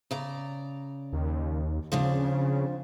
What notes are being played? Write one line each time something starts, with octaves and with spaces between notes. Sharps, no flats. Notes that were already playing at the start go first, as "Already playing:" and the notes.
C#3 D5 A#5
D#2
C#3 F3 C4 D4